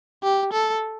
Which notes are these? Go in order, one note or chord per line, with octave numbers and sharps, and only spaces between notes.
G4
A4